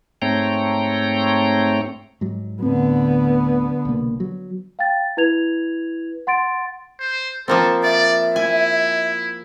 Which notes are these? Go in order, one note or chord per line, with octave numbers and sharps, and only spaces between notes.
G#2 A3 C4 C#5 G5 A#5
G#2 F#3
D1 A2 D3 B3 C4
C2 B2 A#3
F#3
F5 G5 A6
E4 B4 G#6 F7
F#5 C6 A6 D7
C5
F3 A#3 C4 A4
D5 E5
E4 G#5